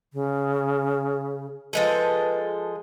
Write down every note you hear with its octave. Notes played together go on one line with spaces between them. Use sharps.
C#3
F3 G#3 A4 B4